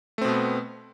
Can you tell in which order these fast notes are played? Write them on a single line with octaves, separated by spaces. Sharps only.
A3 C4 B2 B3